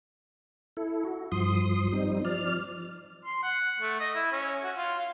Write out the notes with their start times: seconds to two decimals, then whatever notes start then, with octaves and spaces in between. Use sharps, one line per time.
0.77 E4 A4
1.05 F#4
1.32 G2 F3 C6 D#6
1.92 G3 C4 D#4
2.25 F3 D5 F6
3.25 C6
3.43 F#5
3.80 A3
4.00 D#5
4.15 E4
4.32 C#4
4.64 F#4
4.77 F4
4.98 F4